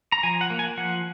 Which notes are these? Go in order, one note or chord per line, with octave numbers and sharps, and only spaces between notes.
A#5
F3 G#5
F#5
A#3
G#5
F3 F#5